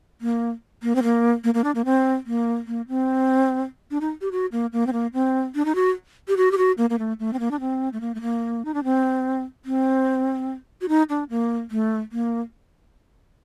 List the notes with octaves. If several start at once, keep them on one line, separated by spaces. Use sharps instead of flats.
A#3
A#3
C4
A#3
A#3
A#3
D4
A#3
C4
A#3
A#3
C4
D4
D#4
G4
F#4
A#3
A#3
C4
A#3
C4
D4
D#4
F#4
G4
F#4
G4
F#4
A#3
A#3
A3
A3
C4
A#3
D4
C4
A3
A#3
A3
A#3
D#4
D4
C4
C4
F#4
D#4
D4
A#3
A3
A#3